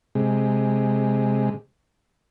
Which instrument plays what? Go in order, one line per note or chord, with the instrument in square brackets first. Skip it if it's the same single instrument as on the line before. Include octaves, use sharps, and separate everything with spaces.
[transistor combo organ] C3 G#3